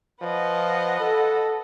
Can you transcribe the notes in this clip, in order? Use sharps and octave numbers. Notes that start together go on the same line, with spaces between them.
F3 B4 D#5 F#5
A4